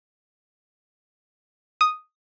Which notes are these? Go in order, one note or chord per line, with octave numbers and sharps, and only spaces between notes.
D#6